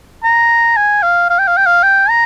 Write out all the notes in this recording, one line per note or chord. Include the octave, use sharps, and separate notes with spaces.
A#5
G#5
F5
F5
G5
F5
G5
F5
G5
A#5